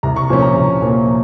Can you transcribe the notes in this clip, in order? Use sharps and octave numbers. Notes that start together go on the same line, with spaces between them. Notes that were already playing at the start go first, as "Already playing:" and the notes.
C2 A#5
C#6
A#2 F3 A#3 C#4
A#5
C2
A#2 F3 A#3 C#4